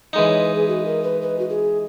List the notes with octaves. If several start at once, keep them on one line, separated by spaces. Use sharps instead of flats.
E3 G#3 D#4 D#5
C#5
B4
G#4
F#4
A#4
B4
B4
F#4
G#4